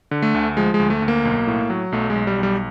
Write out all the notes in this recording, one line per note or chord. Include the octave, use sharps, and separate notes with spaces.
D3
A3
D2
F3 G#3
G#3
D2
A3
D2
A#3
B1
A2
F#3
B1 A3
G#3
B1
G3
B1 G3